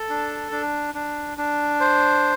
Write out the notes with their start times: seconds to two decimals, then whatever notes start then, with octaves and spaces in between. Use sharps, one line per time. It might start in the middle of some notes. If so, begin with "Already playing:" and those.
Already playing: A4
0.09 D4
0.51 D4
0.94 D4
1.38 D4
1.80 C5